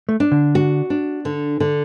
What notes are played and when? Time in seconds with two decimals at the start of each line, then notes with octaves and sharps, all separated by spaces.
0.09 A3
0.20 D4
0.32 D3
0.55 F#4
0.90 D4
1.25 D3
1.60 D3